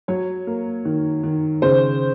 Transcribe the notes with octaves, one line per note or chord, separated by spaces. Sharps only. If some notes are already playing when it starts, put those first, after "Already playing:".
F#3 C#5
A#3
D#3
D#3
C#3 C5